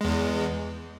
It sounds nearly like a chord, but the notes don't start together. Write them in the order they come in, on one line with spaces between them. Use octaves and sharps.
G#3 E2 E3